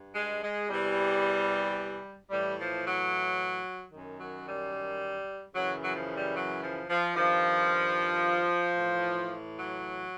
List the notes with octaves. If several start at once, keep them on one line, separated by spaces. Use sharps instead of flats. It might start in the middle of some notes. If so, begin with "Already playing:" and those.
Already playing: G2
G#3
G#3
E2 C3 E3 G3
A2 E3 G3
F3
F#3
F#2 D#3
F#3
G3
F#2 C#3 E3 F#3
F#3
F3
G3
F#3
F3
F3
G2 D#3 F3
A2 E3
F#3